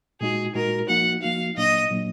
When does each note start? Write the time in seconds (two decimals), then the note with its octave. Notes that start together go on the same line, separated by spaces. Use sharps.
0.21 A#2 G#3 D#4 F#4 G#4
0.55 A#2 G#3 D#4 F#4 A#4
0.88 F3 A#3 D#4 F#4 F#5
1.22 F3 A#3 D#4 F#4 F5
1.56 A#2 F#3 A#3 D4 D#5
1.90 A#2 F#3 A#3 D4